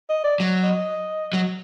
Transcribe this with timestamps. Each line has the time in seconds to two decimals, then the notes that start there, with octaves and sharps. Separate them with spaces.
0.10 D#5
0.24 D5
0.40 F#3
0.63 D#5
1.33 F#3